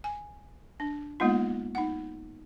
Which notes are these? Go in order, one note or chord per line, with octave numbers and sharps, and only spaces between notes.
G#5
D4
G#3 A#3 B3 D#4 F4
D#4 F#5